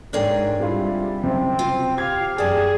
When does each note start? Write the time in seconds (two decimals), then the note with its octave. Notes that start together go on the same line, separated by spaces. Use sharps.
0.13 G#2 D4 G#4 A#4 C#5 G5 G#5
0.60 C3 G3 E4 F4 G4
1.24 F#1 C3 C4
1.59 F4
1.98 G4 F5 G#6
2.38 F#2 G#4 D5 A5